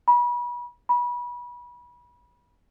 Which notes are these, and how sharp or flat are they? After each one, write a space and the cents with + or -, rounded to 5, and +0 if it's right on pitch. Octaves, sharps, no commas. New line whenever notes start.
B5 -35
B5 -30